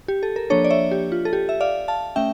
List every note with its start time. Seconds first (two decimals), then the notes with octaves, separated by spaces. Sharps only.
0.08 G4
0.23 A4
0.36 A#4
0.50 F3 A#3 D4 A4 C#5
0.64 D5
0.70 C#5 E5
0.91 G4
1.12 F4
1.25 A4
1.33 G4
1.49 E5
1.60 D5 F5
1.88 F5 A5
2.16 A3 C#4 E5 G5